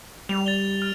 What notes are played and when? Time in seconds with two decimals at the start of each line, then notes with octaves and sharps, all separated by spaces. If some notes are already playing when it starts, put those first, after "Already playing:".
0.29 G3 F7
0.46 A6 F7 G7
0.82 F6